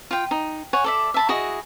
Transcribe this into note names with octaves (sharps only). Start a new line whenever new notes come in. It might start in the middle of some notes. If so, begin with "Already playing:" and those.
F4 G5
D#4
C#5 F#5 G#5
A4 D5 E5
E5 A5 B5
E4 F#4 G#4 D#5